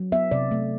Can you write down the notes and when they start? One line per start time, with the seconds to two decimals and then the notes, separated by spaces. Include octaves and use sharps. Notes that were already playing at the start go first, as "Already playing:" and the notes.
Already playing: F#3
0.12 B3 E5
0.31 C3 D5
0.51 A3